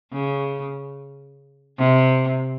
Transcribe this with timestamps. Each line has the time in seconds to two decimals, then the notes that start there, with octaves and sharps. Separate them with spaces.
0.13 C#3
1.78 C3